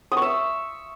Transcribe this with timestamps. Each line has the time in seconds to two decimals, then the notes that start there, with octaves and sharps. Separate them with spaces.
0.12 D#6
0.17 C#6
0.22 E5